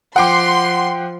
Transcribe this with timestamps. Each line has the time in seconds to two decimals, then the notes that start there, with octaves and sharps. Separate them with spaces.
0.16 F3 F#5 G5 C6 D6